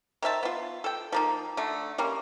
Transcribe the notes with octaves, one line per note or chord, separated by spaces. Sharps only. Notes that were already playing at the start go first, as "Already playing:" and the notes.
D#3 C5 E5 A5
B3 F4
A4 G5
F3 A#3 D#4
D3 A3
G3 A#3 C#4